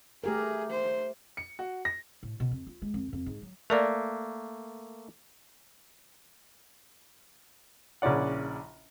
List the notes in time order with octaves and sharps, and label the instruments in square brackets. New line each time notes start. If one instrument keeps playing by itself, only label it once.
[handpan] A3 G4 A#4 [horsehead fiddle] G#4
[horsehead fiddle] C5
[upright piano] C#7
F#4
A#6
[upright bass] A2
B2
F2
F4
G#3
F2
F2
G#2
F#3
[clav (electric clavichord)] A3 A#3 [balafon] A#4 D5
[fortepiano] A#1 C#3 C#4 E4 D5 F#5